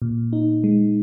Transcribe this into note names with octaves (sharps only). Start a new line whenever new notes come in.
A#2
D#4
G#3